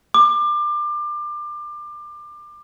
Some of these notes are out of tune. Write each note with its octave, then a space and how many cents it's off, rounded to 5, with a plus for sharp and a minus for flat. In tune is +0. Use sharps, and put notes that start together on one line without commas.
D6 +25